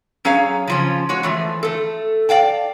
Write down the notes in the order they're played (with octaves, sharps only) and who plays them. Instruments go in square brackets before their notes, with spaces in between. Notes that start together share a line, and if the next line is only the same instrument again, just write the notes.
[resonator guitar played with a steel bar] F#3 C#4 G#4 C#5 F5
C#3 F3 C#4
G#3 F#4 C#5
E3 F3 A3
A3 A4
D5 F5 G5 A5